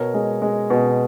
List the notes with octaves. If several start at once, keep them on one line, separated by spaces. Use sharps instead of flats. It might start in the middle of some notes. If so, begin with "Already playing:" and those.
Already playing: B2 A#4 C#5
G#3
G#3
B2